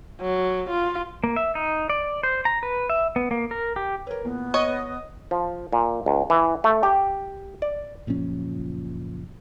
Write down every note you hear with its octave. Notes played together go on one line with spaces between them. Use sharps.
F#3
F4
A#3
E5
D#4
D5
C5
A#5
B4
E5
B3
A#3
A#4
G4
A#4 B4 C#5
E2 A#2 B3
C#5 D#5
F3
A#2
C#2
E3
A3
G4
D5
F#1 A#2 F3 C#4